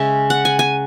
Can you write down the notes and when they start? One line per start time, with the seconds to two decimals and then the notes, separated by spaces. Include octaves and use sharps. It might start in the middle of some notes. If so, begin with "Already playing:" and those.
Already playing: C#3 G#3 C#4 E5
0.30 F#5
0.45 G#5
0.59 G#5